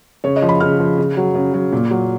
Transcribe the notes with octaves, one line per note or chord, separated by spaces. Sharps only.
C#3 C#5
D#5
F3
B5
C#3 F6
F3
C#3
F#3
C#3
F#3
A#2
F#3